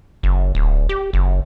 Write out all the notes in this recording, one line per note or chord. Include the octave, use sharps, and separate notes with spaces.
F#1
D1
G4
F#1